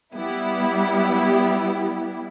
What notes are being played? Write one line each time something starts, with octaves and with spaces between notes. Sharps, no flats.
G3 B3 E4 G4